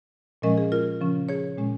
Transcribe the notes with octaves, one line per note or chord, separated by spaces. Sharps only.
A#2 F3 G#3 C#4 A#4 D#5
G#4
F4 A#4
C#3 F3 C#4
G#4 C#5
A#2 G#3 C#4